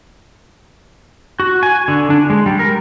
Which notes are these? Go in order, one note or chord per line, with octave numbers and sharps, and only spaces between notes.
F#4
G#5
D3
D4
G#3
G3
A#4